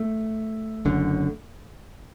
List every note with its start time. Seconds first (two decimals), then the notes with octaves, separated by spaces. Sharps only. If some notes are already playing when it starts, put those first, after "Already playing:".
Already playing: A3
0.85 F#1 F#2 D3